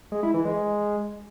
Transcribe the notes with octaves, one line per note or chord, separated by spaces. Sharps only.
G#3
E4
E3
G#3